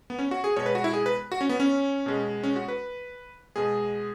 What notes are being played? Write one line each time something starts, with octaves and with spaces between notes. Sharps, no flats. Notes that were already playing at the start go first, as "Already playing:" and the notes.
B3
C#4
F#4
G#4
B2 G#3 C#5
B4
F#4
E4
G#4
B4
F#4
C#4
B3
C#4
B2 G#3
C#4
F#4
B4
B2 G#3 G#4